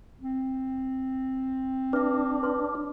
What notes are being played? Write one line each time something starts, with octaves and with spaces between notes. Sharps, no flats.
C4
D4 B4 E5
B4 C#5 C6